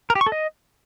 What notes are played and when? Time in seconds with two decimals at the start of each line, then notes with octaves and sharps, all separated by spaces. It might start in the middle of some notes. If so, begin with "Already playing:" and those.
0.10 A#4
0.15 G4
0.21 C#6
0.27 A4
0.32 D#5